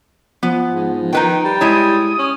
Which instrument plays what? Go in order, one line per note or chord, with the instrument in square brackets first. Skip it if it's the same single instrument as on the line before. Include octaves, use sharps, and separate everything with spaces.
[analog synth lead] F3 [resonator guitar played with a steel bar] B3
[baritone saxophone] G#2
[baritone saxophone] D#3 [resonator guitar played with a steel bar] D#4 B4 G5
[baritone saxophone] G3
[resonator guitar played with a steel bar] G#3 E4 C#5 [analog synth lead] D#6
[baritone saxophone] C#4